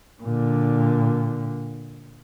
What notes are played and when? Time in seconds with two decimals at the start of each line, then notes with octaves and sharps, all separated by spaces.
0.23 A#2 D3